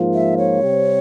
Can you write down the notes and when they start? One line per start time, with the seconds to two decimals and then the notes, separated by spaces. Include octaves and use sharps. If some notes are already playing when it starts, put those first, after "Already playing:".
Already playing: G#2 F3 A#3 F4
0.14 E5
0.38 C#5
0.61 C3 G3 C4